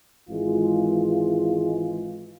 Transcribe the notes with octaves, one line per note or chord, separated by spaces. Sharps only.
G#1 E3 G#3 F4